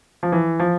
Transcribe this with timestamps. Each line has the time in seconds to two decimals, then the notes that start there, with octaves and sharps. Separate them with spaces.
0.23 F3
0.32 E3
0.60 F3